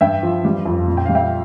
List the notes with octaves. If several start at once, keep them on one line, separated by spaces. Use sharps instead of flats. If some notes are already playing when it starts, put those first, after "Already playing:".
G2 E5 G5
F3
G3
F2
A#2
G5
G3 F5
E5 G5